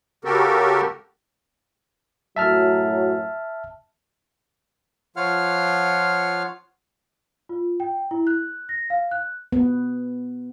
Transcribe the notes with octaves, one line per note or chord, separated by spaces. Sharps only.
C#3 F#4 G4 A4 A#4
F#2 A2 F#3 E5 A5 F6
F3 F4 C#5 F5 F#5 F6
F4
G5
E4
F#6
A#6
F5
F#6
B3